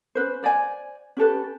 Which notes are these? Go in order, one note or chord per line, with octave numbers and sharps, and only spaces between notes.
C#4 B4 C5
C5 D5 D#5 G#5
C#4 G4 A4 B4